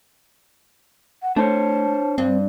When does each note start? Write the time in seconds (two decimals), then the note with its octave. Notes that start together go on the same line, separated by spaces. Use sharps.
1.22 F#5
1.36 A3 D4 C5 C#5 A5
2.18 G2 C4